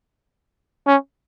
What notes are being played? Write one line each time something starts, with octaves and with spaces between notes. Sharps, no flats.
C#4